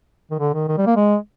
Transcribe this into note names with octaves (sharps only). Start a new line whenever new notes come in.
D#3
D3
D#3
D#3
G3
A#3
G#3